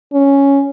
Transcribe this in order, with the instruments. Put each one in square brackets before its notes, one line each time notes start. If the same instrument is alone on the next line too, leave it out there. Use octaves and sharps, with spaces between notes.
[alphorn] C#4